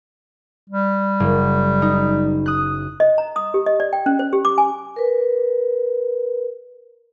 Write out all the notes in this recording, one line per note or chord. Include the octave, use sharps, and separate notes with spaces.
G3
F#1
D#4
D#6 F#6
D#5
A#5
D#6
G4
D#5
D5
G5
C#4
C5
G4
D6
G#5
A#4 B4